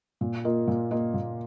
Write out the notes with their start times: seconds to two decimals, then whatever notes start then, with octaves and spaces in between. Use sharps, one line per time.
0.21 A#2
0.45 A#3 F4 A#4 D#5
0.68 A#2
0.91 A#3 F4 A#4 D#5
1.14 A#2